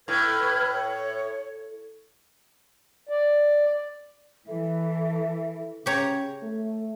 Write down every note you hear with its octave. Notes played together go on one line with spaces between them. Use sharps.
A2 B4 F6 G#6
C#5
D5
E3 A4 E5
C#3 G4 C#5 A#5
A3